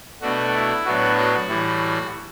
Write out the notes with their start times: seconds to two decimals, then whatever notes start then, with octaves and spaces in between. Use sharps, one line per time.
0.22 B2 A3 D4 F#4
0.54 E4
0.85 A2 F#3 B3 D4 F#4
1.17 F#4
1.48 A2 E3 G3